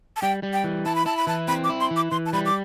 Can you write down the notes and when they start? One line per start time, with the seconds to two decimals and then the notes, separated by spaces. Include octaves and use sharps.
0.16 A5
0.22 G3 G5
0.43 G3
0.53 G5
0.64 E3
0.86 E4 A5
0.95 B5
1.06 E4 A5
1.17 B5
1.27 E3 A5
1.48 C4 B5
1.64 D6
1.69 E4
1.81 C6
1.91 E3
1.96 D6
2.11 E3 C6
2.26 A5
2.33 G3 B5
2.46 D6